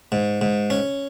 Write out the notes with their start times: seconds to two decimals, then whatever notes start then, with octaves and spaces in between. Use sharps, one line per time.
0.12 G#2
0.41 G#2
0.70 C#4